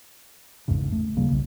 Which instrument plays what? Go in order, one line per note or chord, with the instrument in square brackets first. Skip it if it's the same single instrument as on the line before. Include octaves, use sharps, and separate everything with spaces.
[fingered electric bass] A1 E2 G#2 C#3
A3
D#1 C#3 G3 A#3
B1 C#3